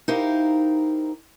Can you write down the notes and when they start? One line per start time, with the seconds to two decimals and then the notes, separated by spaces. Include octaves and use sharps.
0.08 D#4 E4 G4 A#4 C5 F5